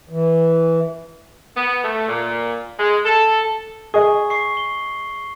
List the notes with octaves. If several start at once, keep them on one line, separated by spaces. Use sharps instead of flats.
E3
B3
A3
A#2
G#3
A4
G#4 D#5 C#6
C#6 C7
G7